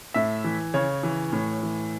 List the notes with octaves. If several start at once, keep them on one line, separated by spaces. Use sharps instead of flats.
A2 E5
E3
C#3 C#5
E3
A2
E3